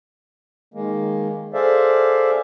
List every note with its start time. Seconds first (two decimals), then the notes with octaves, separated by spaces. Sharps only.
0.74 D#3 G#3 A#3
1.54 G#4 A4 C5 D5 E5 F5